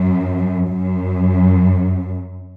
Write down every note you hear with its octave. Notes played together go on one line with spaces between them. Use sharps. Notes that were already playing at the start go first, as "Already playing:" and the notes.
Already playing: F#2
F#2